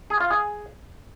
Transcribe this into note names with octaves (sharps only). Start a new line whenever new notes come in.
G#4
F4
G#4